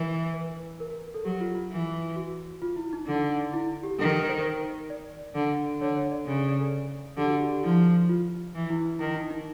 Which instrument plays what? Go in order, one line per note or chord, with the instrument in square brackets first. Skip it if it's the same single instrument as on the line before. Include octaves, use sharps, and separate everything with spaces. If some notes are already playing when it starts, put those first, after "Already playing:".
Already playing: [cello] E3 [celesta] A#4
[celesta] B4
A#4
A#4
A4
[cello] F#3 [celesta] G4
[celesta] F4
F4
[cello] E3
[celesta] F#4
F4
E4
D#4
[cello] D3
[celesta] E4
G4
[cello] D#3 [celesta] A4
[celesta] A#4
C5
A#4
D5
[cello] D3
[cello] D3 [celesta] C#5
[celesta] C#5
D5
[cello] C#3
[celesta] D5
A4
[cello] D3 [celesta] G4
[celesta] F#4
G4
G4
[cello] F3 [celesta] E4
[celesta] F4
[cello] E3
[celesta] E4
E4
[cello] D#3 [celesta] E4
[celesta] D#4
D#4